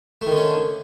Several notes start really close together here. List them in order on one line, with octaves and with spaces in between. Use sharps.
A3 D#3 D3 C#4